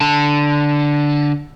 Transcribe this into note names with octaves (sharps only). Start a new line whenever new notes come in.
D3 A5